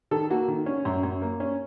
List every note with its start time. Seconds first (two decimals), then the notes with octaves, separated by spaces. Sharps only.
0.11 D#3 A4
0.30 A#3 F#4
0.48 D#3
0.66 C#4
0.85 F#2
1.03 F#2
1.22 A#3
1.40 C#4